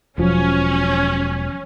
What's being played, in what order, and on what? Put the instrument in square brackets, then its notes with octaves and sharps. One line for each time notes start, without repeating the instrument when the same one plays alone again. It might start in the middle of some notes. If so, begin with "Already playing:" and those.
[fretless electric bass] E1 F3 F#3 [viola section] C#4